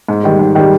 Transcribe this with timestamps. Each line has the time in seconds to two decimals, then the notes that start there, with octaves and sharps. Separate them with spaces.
0.09 G#2
0.23 D#3 G3
0.39 G#2
0.55 D#3 G3